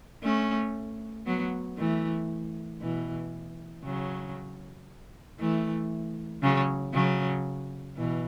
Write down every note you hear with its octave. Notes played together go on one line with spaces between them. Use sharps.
A3 C#4
F#3 B3
E3 A3
B2 E3
C#3 F#3
E3 A3
C#3 F#3
C#3 F#3
B2 E3